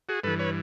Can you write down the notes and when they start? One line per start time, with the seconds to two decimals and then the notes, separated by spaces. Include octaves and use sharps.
0.09 F#4 G#4
0.23 G2 E3 A4 B4
0.39 B4 C#5